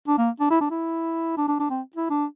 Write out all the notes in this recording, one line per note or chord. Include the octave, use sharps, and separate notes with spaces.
D4
A#3
D4
E4
D4
E4
D4
D4
D4
C4
E4
D4